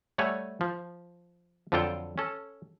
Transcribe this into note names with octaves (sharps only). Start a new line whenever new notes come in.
G3 A3 C#5 E5 F#5 G#5
F3
F2 D3 F#3 F4 A4 G5
C#4 A4